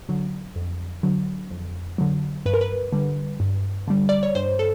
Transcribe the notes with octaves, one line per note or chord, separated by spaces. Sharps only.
D3 F#3
F2
D3 F#3
F2
D3 F#3
G2 B4
A#4
B4
D3 G3
G2
D3 G3
D5
C#5
G2 C5
A4